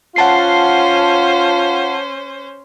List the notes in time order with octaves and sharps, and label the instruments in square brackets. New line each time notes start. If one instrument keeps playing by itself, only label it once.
[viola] C#4 C5 [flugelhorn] F4 [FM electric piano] F#5 A5 C7